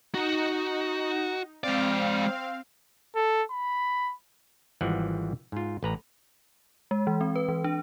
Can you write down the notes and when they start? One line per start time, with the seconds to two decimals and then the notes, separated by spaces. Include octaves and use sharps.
0.14 D#4 F#4
1.64 G#3 C4 D5 F5
3.15 A4
3.50 B5
4.81 G#1 E3 F3 G3 F#5
5.52 G#2 F4
5.83 A1 B4 A#5
6.91 G#3
7.07 E3
7.21 C4
7.36 B4
7.49 E3
7.64 D4